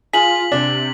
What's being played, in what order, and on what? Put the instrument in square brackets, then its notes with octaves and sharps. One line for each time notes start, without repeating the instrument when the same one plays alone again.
[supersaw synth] F4 [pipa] G#4 F5 [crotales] B6 F#7
[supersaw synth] C3 [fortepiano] D4